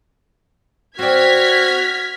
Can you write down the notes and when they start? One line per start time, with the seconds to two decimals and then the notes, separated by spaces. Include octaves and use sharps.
0.99 C4 F#4 D5 F6 G#6 B6